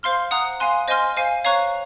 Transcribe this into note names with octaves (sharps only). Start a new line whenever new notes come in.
C5 F5 C6 F6
F#5 A#5 D#6 F#6
F5 G#5 C6 F#6
C5 D#5 G#5 C6 F6
C5 F5 G#5
C#5 F5 A#5 C#6 F#6